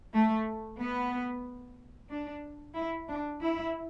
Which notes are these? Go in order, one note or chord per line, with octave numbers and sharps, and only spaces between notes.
A3
B3
D4
E4
D4
E4